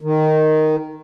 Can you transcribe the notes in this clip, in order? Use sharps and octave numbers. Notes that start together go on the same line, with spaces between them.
D#3